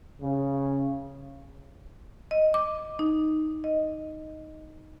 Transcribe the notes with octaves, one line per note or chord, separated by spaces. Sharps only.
C#3
D#5
D6
D#4
D#5